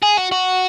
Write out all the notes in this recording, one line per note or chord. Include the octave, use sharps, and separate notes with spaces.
G#4
F#4
F#4